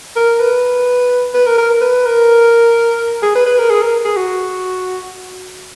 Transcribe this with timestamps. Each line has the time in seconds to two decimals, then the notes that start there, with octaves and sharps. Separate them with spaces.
0.16 A#4
0.40 B4
1.34 B4
1.46 A#4
1.58 A#4
1.81 B4
2.06 A#4
3.22 G#4
3.35 B4
3.46 B4
3.59 A#4
3.70 G#4
3.82 A#4
4.05 G#4
4.17 F#4